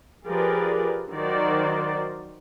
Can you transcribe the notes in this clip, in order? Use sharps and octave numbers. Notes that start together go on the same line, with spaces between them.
F3 G4 G#4 A#4 B4 D5
D#3 F#3 F#4 A#4 C5 D5